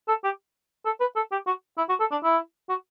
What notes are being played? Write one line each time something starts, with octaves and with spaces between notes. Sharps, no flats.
A4
G4
A4
B4
A4
G4
F#4
E4
F#4
A4
D4
E4
F#4